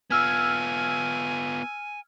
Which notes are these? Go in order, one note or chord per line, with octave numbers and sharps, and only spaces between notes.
B3 F4 G#5 E6 F6 G#6